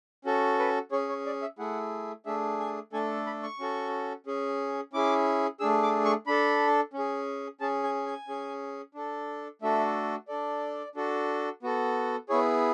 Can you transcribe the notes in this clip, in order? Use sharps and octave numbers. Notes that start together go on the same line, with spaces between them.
C#4 F#4 A4
B4
C#4 G#4 C#5
C#5
D5
E5
A3 E4 G#4 F#5
A3 D4 G#4 E5
G#5
A3 D4 A4 G#5
B5
C#6
C#4 F#4 A4
C#4 G#4
C#4 E4 G#4 D6
A3 D4 G#4 E6
D6
C#6
D4 A4 B5
C#4
G#4
C#4 G#4 A5
G#5
G#5
C#4 G#4
D4 A4
A3 D4 F#4 A4 E5
D4 A4 D5
D4 F#4 A4
B3 F#4 A4
B3 E4 G#4 C#5